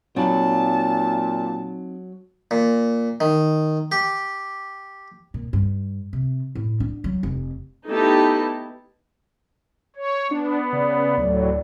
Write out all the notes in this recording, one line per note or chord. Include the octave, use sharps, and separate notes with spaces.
A#2 F#3 C4 D#4 A5 B5
A#2
D#3
G4
A#2
G2
C3
A2
D4
F#3
F1
A3 B3 D#4 E4 G4 A5
C#5
B3 D4
C#3 D5
D2 A2 F#3